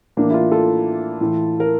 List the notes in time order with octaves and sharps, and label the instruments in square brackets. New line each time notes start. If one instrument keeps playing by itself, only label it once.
[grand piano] A2 E3 A#3 D4
E4
D4 F4
F4 A4
A2 E3
A#4